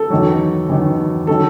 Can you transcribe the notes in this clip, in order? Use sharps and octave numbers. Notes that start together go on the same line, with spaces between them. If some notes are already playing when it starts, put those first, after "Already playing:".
Already playing: A4
E2 D#3 F#3
E2 D#3 F#3
D#3 F#3 A4